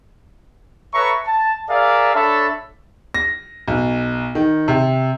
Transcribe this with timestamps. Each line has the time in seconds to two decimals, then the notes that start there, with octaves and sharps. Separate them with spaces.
0.93 A4 B4 C#5 E5 A#5 C#6
1.26 A5
1.70 G#4 A#4 D5 E5 F5
2.14 D4 A4 C#5 E5 A5 B5
3.14 A#6
3.68 B1
4.35 D#3
4.68 C3